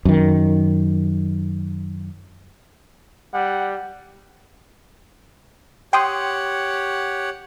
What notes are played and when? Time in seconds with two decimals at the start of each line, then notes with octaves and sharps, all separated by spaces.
0.05 F#2 D#3
3.34 G3 F#5
5.93 G4 C#5 F#5 G5 C6 D#6